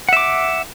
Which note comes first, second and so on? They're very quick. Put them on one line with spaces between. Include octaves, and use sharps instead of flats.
F#5 E5 D6